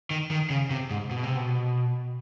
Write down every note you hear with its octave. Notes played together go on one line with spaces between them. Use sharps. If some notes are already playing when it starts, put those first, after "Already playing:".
D#3
D#3
C#3
C3
G#2
B2
C3
B2